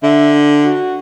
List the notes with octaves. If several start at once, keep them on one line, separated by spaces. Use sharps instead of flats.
D3 E5
F#4